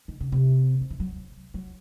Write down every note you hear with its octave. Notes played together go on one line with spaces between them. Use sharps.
D#3
C#3
C3
D#3
E3
F#3
F#3